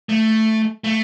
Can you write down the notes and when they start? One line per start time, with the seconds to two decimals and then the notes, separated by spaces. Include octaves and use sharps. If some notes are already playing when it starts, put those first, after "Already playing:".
0.09 A3
0.84 A3